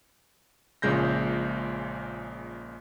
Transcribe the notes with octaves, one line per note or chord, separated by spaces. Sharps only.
A#1 A#2 C#3 G#3 G6 A#6